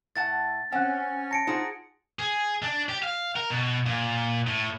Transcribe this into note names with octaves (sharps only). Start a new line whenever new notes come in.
A2 F#5 A5 A6
C4 C#4 F#5 F#6
A5 A#6 C#7 D7
D#4 F4 F#4 G#4 C5
G#4
D4
G4
F5
A#4
B2
A#2
A2